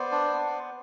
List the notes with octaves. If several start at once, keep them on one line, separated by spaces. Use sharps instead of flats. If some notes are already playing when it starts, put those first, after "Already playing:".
Already playing: B3 C5 D5
D4
B3